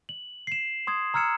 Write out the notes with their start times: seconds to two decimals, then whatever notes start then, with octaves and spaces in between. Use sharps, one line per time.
0.09 F#7
0.47 C7 E7
0.87 C6 D#6 G#6
1.14 A#5 E6 F6 G#6 C#7 E7